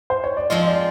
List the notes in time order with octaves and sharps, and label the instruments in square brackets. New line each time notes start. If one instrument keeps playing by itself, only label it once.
[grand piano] C5
C#5
D5
[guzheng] F3 G#3 C4 F4 [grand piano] D#5
[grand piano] D5